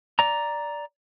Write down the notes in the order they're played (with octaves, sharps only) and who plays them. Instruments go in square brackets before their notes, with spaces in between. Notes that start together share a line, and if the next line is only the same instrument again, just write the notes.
[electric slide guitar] D5 A#5